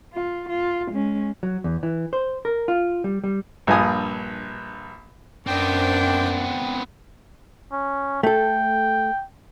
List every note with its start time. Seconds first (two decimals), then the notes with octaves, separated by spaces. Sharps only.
0.13 F4
0.49 F4
0.91 G#3 C#4
1.43 F#3
1.64 E2
1.83 E3
2.13 C5
2.45 A#4
2.68 F4
3.04 G3
3.24 G3
3.67 A#1 G2 F4 G#5 D#6
5.47 F#2 B3 C4 D4 C5 G5 D6
7.72 C#4
8.23 A3 A4 G5